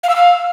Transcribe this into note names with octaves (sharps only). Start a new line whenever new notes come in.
F5
E6
F5